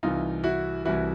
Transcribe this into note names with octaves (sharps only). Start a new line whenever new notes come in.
C2 C3 E3 D#4 F4
E4 F#4
C2 C3 E3 E4 F#4